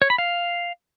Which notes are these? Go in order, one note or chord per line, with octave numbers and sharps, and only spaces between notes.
C#5
B5
F5